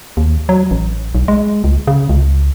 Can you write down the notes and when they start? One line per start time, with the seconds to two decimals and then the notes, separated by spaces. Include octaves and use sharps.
0.17 D#2
0.49 F#3
0.71 A1
1.15 B1
1.28 G#3
1.64 C#2
1.87 C#3
2.09 C#2